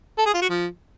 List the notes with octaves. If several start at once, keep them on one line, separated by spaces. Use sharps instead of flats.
A4
G#4
F4
F#4
F3